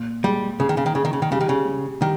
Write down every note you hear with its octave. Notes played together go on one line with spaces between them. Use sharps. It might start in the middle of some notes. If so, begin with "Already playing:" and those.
Already playing: A#2
G3 G#3
C#3 G#4
D#3
C#3
D#3
C#3 G#4
D#3
C#3
D#3
C#3 G3
D#3
C#3
G3
D#3 G3